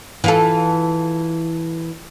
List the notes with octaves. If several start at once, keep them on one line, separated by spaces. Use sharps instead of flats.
E3 F4 A4